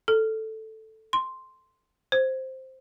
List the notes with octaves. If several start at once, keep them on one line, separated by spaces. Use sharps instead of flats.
A4
C6
C5